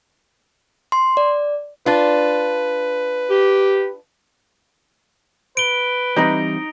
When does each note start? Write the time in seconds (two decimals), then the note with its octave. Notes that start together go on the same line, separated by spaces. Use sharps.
0.92 C6
1.17 D5
1.86 D4 F4 B4
3.30 G4
5.57 B4 D7 G7
6.16 E3 G3 C4 D#4